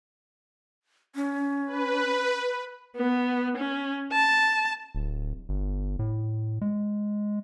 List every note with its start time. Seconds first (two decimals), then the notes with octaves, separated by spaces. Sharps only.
1.16 C#4
1.66 B4
2.96 B3
3.57 C#4
4.12 A5
4.95 D1
5.49 G1
5.99 A2
6.61 G#3